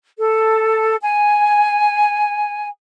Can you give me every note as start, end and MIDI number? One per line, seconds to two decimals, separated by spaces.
0.18 0.95 69
1.02 2.68 80